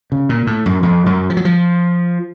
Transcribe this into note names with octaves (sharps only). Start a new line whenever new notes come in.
C#3
A#2
A2
F#2
F2
F#2
F3
F#3
F3